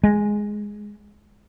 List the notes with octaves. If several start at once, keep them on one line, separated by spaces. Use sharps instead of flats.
G#3